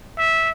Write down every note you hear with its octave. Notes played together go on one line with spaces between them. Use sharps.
E5